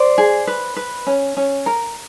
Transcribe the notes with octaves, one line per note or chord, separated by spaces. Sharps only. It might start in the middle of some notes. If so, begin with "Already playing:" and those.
Already playing: C5 D5
G#4
B4
B4
C#4
C#4
A#4